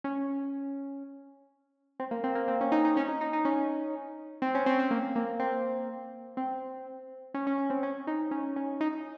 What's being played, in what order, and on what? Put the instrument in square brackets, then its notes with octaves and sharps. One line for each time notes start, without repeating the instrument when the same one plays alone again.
[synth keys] C#4
C4
A#3
C4
A#3
C4
C#4
D#4
D#4
C#4
D#4
D#4
D#4
C#4
C4
C#4
C4
C4
A#3
A#3
C4
C4
C#4
C#4
C#4
C4
C#4
D#4
C#4
C#4
D#4